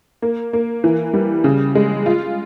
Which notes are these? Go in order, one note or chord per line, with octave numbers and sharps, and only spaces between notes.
A#3
A#3
E3
G3
C#3
G#3
F4